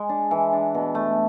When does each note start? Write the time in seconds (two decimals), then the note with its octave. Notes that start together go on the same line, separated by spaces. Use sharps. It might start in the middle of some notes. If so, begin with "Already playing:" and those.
Already playing: G#3
0.09 D4
0.31 E3
0.53 D4
0.74 B2
0.95 A3